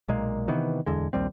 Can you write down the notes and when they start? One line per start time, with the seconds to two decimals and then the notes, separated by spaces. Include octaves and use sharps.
0.08 B1 A#2 G#3 A#3
0.48 C3 D#3 E3 B3
0.86 D1 E2 D3 G#3
1.13 A#1 D#2 G3 C4